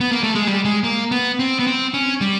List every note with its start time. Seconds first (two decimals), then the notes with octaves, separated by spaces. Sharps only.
0.01 B3
0.12 A#3
0.23 A3
0.35 G#3
0.47 G3
0.65 G#3
0.84 A#3
1.11 B3
1.40 C4
1.59 B3
1.67 C4
1.94 C#4
2.21 G3